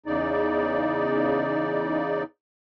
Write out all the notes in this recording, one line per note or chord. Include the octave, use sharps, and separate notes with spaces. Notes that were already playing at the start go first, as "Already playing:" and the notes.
E2 C#3 D#4 D5